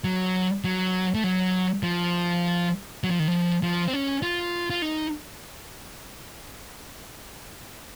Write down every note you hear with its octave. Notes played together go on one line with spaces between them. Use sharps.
F#3
F#3
A3
F#3
F3
F#3
F3
D#3
F3
F3
C4
C#4
F4
F4
D#4